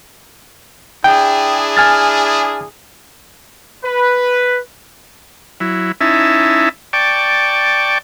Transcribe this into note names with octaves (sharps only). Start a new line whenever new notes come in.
D4 E4 G#4 G5
G#5 F6 A6
B4
F#3 E4
C#4 D#4 E4 E5 A5
D5 G5 A5 C#6 D6